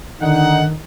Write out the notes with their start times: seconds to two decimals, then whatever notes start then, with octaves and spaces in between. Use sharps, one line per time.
0.21 D3 D#3 D#4 F#5